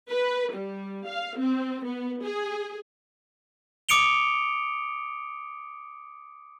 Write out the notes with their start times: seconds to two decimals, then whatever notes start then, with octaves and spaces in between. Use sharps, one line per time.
0.12 B4
0.54 G3
1.07 F5
1.38 C4
1.85 B3
2.23 G#4
3.89 D6 D#6 C#7 D7 F7 G7